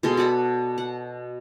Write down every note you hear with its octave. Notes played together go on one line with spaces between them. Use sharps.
B2 G#3 A4 C6
F#4 D5 F#5 B5
F#5